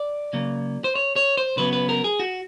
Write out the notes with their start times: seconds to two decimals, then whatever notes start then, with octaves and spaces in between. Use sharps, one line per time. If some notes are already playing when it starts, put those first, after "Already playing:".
Already playing: D5
0.33 C#3 F#3 A#3
0.84 C5
0.95 C#5
1.16 C#5
1.37 C5
1.57 C#3 F#3 B3 B4
1.73 B4
1.89 A#4
2.04 G#4
2.20 F#4